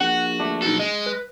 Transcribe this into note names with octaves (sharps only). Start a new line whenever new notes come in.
A#1 F#4 F#5
A3 D4
B1 D#4 F#4 A4
G#3 D#5
B4